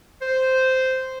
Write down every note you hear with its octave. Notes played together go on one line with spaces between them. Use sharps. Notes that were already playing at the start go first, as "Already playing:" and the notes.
C5